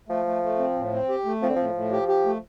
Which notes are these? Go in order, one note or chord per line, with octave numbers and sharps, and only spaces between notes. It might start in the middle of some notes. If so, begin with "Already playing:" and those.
F3 A3
A3
A3
C4
A2
C4
G4
A3
F3 C4
D3
A2 F3
A2
G4
G4
A3